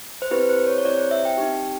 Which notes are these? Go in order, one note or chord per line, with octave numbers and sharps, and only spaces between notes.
C5
C4 E4 G4 B4
C5
C#5
C#5
C4 E4 G4 D5
C5
E5
G5
C4 D#4 G4